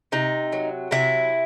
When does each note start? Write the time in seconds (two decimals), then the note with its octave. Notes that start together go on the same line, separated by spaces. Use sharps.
0.12 C3 D#4
0.52 F#3
0.91 C3 E4